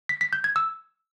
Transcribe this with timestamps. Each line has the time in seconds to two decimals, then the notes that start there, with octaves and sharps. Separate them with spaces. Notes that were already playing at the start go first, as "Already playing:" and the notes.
0.09 B6
0.21 B6
0.33 G6
0.44 G#6
0.56 E6